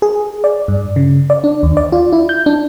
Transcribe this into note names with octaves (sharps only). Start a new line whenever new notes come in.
G#4
D5
G2
C#3
D5
D4
D#2
D5
F4
E4
G6
D4